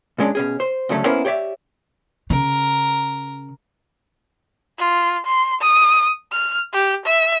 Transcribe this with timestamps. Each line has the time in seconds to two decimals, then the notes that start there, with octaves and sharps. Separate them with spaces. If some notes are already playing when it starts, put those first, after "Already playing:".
0.18 A#2 G#3 C#4 D4
0.35 B2 C#4 G#4
0.60 C5
0.89 D2 C#3 F#3 A3 C#4
1.05 A#3 B3 C#4 E4 A#4 C5
1.25 G4 C#5 D5 E5
2.30 C#3 A#4
4.79 F4
5.26 C6
5.61 D#6
6.32 F6
6.74 G4
7.05 E5